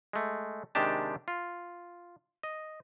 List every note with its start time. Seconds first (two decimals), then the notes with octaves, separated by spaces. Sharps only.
0.13 G#3 A3
0.75 C3 D#3 G#3 D4 G4 A5
1.28 F4
2.43 D#5